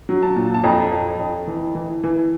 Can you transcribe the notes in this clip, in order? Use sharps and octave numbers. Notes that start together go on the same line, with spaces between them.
F#3
A5
A#2
A5
F2 A#5
F2
F2
E3
E3
E3